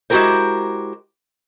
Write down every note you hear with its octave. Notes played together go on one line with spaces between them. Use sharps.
G#3 E4 F#4 G4 A#4 C5